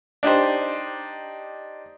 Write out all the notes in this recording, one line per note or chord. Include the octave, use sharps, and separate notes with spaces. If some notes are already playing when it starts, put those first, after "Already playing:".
D4 D#4 G4 C5